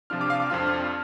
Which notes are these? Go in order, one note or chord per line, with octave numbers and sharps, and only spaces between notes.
C3 F3 D4 F4 F6
D6
F5
D6
F2 F3 D4 F4 F6